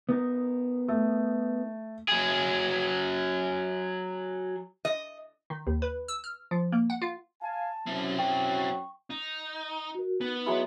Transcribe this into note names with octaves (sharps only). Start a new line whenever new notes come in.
B3 D#4 A#4
A3
F#3 G#4
D#5
D#3
D#2
B4
E6
F6
F3
A#3
F#5
F4
F5 G#5 A5
F#2 C4 E4
F#2 F#3 G5 C#6
D#4
F#4 A#4
B3 D#4
F#3 G#3 E4